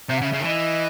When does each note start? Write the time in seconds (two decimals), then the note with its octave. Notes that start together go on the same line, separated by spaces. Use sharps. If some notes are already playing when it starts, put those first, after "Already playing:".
0.09 C3 E5
0.17 F#5
0.21 C#3 E5
0.33 C#3
0.40 D#3
0.44 E3 D#5